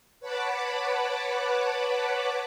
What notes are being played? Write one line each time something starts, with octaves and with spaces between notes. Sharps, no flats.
B4 C#5 F#5 A5 B5 D6